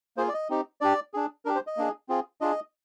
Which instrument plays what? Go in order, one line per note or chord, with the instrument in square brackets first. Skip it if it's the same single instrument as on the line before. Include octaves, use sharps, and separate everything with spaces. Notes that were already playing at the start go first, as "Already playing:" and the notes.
[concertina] A#3 F4 G#4 C5
D5
D#5
C4 D#4 G4
D4 G4 D5
D4 G#4
D4 G4 A#4
C5
D#5
A#3 D4 G#4
C4 F4 G#4
D4 F4 G#4 D#5